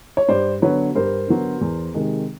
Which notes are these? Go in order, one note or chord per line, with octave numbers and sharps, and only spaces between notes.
C#5
G2 C5 D5
D3 F#3 B3 B4 C#5
G2 A#4 C5
D3 F#3 B3
E2
C3 D#3 G#3